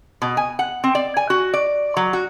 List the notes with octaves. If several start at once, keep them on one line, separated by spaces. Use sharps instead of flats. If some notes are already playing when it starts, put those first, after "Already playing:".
B2
G#5
F#5
C4
D5
G#5
F#4
D5
F#3
F#4